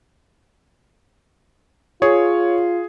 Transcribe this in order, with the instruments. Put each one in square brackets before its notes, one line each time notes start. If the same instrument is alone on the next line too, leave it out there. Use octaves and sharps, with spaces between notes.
[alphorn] F4 [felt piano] G#4 [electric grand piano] C#5